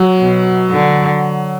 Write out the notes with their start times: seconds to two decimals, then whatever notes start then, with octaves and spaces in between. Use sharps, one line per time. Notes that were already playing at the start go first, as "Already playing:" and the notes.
Already playing: F#3
0.19 B2
0.70 D3